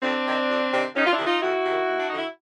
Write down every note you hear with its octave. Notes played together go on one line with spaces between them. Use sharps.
F2 C4 D4
C3 D#3
F2
C3 D#3
F2 C#4 D#4
F4
D4 E4
C3 D#3
D#4 F4
F2 E4 F#4
C3 D#3
D#2
D4
D3 F3 D#4
E4